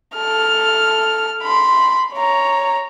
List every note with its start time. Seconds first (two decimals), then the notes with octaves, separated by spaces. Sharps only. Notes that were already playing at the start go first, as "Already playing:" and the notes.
0.15 A4 F6
1.42 B5 C6
2.14 C#5 A#5